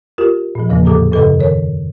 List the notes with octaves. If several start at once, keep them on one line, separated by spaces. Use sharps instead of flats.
F4 G4 A#4
A#2 F3
E2 C#3 E3 F3 A#3
A2 D3 G#4 A4 D6 D#6
F#2 C#3 A4 B4 D#5
D#3 A#4 C#5